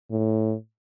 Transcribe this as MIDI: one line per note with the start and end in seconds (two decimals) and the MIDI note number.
0.11 0.55 45